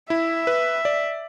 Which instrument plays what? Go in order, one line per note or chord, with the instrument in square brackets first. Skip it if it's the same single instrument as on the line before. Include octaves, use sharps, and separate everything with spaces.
[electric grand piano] E4 [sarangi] E5
[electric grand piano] B4
D5